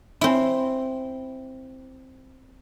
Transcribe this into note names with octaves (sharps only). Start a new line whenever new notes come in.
C4 E4